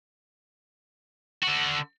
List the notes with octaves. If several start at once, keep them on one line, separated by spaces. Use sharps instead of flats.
D3 F#4